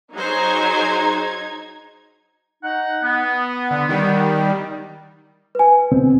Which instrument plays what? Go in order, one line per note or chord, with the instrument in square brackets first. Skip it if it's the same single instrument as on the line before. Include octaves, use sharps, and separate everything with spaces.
[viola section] F#3 G#4 C5 [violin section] D#4 G#6
[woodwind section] D#4 F#5
B3
[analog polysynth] D3
D#3 G3
[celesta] B4 G#5
[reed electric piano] D2 B2 C4